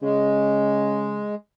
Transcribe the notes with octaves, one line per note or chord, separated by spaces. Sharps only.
C#3 G#3